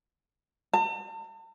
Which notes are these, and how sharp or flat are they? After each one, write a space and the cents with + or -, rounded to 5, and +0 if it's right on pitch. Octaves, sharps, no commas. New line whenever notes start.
A5 +45